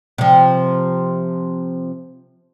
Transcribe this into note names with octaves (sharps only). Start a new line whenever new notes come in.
C3 F3